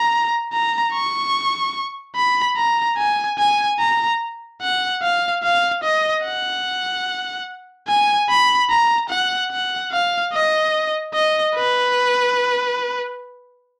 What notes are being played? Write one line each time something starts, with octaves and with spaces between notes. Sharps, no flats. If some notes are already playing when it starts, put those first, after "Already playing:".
Already playing: A#5
A#5
C#6
B5
A#5
G#5
G#5
A#5
F#5
F5
F5
D#5
F#5
G#5
B5
A#5
F#5
F#5
F5
D#5
D#5
B4